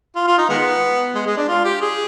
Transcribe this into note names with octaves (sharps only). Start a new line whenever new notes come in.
F4
F4
D#4
D#3 G#3 B3
G#3
G#3
D4
F4
G4
G#4